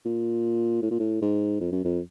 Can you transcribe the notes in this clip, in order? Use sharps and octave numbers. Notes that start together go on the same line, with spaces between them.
A#2
A2
A#2
A2
G#2
F2
F#2
F2